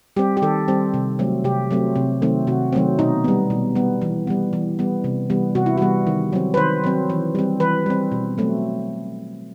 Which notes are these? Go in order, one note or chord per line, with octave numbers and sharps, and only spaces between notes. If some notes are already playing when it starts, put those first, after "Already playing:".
G3 C4 G4
G4
D#3 A4
G3 C4
C3
F#3 A3 C4
C3 G4
F#3 A3 C4
C3
D#3 F#3 A3 C4
C3 F#4
D#3 F#3 A3 C4
B2 D#4
G3 B3
B2
G3 B3
E3
G3 B3
E3
G3 B3
C3
E3 G3 B3
C3 F#4
E4
E3 G3 B3 F#4
D#3
F#3 C4
B4
D#3 C5
F#3 C4
E3
G3 C4
E3 B4
G3 C4
B2
F#3 A3 C4